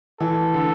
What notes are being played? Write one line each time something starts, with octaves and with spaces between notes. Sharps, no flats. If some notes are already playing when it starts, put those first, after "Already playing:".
E3 A4
D3